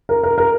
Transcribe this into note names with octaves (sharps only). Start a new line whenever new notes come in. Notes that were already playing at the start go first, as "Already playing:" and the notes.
A#4
A#4
A#4